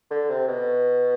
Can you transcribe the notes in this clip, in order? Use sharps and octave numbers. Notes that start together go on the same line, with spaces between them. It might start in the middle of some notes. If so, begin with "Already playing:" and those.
D3
C3
B2